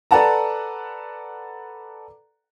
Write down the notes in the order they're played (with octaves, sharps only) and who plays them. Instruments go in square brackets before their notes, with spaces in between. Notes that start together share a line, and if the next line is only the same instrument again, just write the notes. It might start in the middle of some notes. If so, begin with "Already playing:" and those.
[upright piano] A4 B4 D5 F#5 A5 A#5